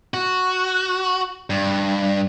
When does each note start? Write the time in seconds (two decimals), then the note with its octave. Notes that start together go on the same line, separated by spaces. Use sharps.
0.14 F#4
1.50 G2